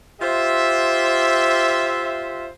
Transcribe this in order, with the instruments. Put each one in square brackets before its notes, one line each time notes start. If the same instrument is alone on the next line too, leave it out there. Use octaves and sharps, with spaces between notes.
[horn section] F4 G4 C5 E5